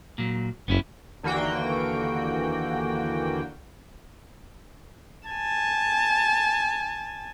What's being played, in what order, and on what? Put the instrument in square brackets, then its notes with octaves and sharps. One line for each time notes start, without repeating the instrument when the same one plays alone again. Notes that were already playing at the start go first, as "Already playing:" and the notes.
[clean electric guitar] A#2 F#3
[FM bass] F#1 [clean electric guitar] B3 C#4 E4
[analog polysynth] D#2 D3 E3 A#3 F#4 G5
[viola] G#5 A5